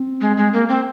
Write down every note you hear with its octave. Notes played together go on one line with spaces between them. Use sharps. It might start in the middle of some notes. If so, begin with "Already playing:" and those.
Already playing: C4
G#3
G#3
A#3
C4